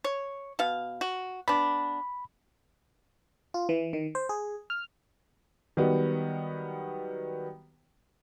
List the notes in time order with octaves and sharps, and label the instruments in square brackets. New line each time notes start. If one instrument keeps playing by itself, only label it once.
[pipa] C#5
B2 F5
F#4
[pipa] B3 D4 [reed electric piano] B5
[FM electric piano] F4
E3
D#3
C5
G#4
F6
[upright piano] D#3 F#3 G3 B3